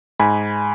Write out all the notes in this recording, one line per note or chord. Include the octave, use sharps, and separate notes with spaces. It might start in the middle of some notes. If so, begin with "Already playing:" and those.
G#2 G#5 B5